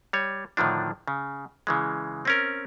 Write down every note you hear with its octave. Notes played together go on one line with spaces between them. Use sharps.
G3 C#5
A2 D3 D#3 F3 D4
C#3
C#3 E3 G#3
C4 C#4 A#4